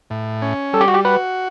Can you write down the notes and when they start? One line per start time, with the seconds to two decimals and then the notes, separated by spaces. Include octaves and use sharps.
0.10 A2
0.42 C#4
0.73 G3 A4
0.81 G4
0.88 F#4
0.94 G4
1.05 F#4 B4